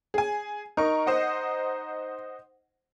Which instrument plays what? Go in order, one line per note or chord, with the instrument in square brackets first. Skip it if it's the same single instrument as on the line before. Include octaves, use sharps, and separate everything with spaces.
[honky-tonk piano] G#4 G#5
[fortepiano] D#4 [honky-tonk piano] A#4 C#6
[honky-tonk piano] C5 D#5 F#5